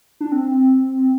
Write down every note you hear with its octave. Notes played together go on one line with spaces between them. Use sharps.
D4
C4